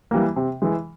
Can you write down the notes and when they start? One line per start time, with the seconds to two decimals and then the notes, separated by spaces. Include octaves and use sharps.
0.11 E3 G3 A#3
0.36 C3
0.62 E3 G#3